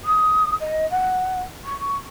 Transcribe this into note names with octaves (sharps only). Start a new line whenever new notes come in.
D#6
D#5
F#5
C#6